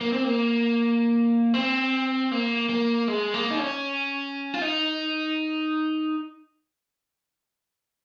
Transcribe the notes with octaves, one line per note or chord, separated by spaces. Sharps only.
A#3
C4
A#3
C4
A#3
A#3
G#3
A#3
D#4
C#4
F4
D#4